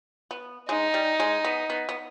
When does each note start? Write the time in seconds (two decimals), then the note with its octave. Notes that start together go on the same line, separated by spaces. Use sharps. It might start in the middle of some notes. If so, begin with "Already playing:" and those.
0.31 B3
0.69 G#3 D#4
0.94 G3
1.20 G#3
1.45 B3
1.70 B3
1.89 B3